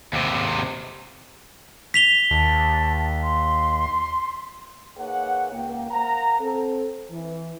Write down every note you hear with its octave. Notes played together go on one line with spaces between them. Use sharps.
D#2 C3
B6 F7 G7
D#2 A5
C6
A#3 D#4 G#4 B4 C#5 F#5
C#2 A#3 G5
A#4 C5 F5 F#5 A#5
C4 A4
E3